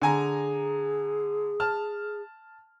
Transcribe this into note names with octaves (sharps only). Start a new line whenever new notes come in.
D3 G#4 G#5 A#5
A5 F6